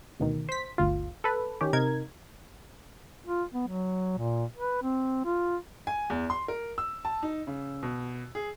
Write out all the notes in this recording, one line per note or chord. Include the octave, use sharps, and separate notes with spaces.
D2 B2 D#3
C5 B6
G1 D2 F4
A4 B4
D#3 C#4 G4
C3 D#4 A#4 G#6
F4
B3
F#3
A#2
B4
C4
F4
G#5
E2
C6
A#4
E6
A5
D#4
C#3
B2
G#4